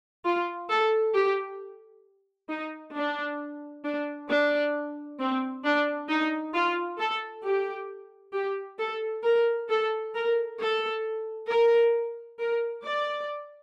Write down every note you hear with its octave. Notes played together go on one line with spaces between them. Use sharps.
F4
A4
G4
D#4
D4
D4
D4
C4
D4
D#4
F4
A4
G4
G4
A4
A#4
A4
A#4
A4
A#4
A#4
D5